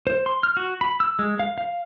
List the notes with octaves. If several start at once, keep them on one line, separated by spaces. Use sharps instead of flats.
C5
C6
F6
F#4
B5
E6
G#3
F5
F5